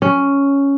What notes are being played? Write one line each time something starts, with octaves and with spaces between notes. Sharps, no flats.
C#4